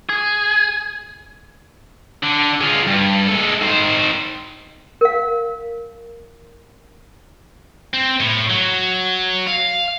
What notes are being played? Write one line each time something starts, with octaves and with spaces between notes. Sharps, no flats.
G#4
D3
G#3 F4
G2
G#3 A4
D#3 C5
A#4 F5
C4
A2
F#3
F5